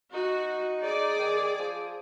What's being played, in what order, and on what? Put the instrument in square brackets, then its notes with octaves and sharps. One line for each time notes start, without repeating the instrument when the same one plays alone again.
[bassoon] D#4 [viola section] F#4
[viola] G#4 [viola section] D5
[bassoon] D#3
F3